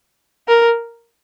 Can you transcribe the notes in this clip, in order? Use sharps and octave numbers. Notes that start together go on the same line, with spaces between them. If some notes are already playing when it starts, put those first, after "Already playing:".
A#4